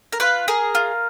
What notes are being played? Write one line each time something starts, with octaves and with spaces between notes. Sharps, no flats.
A#4
F4 B4
G#4 A#4
F4